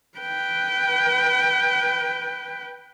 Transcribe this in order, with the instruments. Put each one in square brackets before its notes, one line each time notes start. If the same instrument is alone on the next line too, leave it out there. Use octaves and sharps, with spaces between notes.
[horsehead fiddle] B4 G5